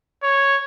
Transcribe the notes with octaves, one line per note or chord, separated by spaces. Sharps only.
C#5